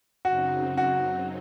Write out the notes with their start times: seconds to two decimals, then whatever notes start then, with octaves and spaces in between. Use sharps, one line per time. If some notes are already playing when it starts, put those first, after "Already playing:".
0.25 F#2 C#3 F#3 C4 D#4 F#4
0.77 F#4